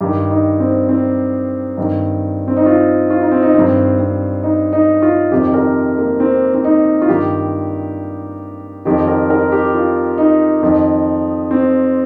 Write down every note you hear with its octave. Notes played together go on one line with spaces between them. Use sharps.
G2 D#3 G4
D#4
C4
C4
G2 D#3
C4
D#4
F4
F4
D#4
C4
D#4
G2 D#3 C4
C4
D#4
D#4
F4
F2 C3 D#3 G4
A#4
A#3
C4
C4
D#4
F4
G2 D#3 G4
F2 D#3 G4
A#4
A#4
G4
F4
D#4
F2 D#3
C4